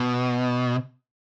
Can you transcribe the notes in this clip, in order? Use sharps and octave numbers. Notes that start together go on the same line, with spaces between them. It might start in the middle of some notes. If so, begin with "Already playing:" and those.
Already playing: B2